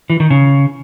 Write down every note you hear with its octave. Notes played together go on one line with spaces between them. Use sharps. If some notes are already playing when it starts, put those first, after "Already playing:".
E3
D#3
C#3